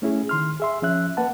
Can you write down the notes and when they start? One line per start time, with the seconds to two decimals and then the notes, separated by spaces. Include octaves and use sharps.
0.02 A3 C#4 E4 G#4
0.29 D#3 C6 F6
0.60 G#4 E5 C6
0.82 F3 C#4 E5 F#6
1.17 A#3 B4 F#5 A5